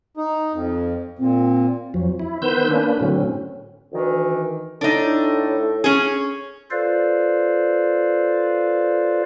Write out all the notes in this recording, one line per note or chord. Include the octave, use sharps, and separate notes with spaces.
D#4
F2
A#2 C4
F2 F3 F#3
E4
D#3 B3 B4 C5 E6 G6
A#3 C#4 D4 B4
A2 D3 F#3 C4 C#4
D2 D#3 E3
A2 D4 D#4 A4
C#4 G#4
F4 A4 B4 C5 D5 F5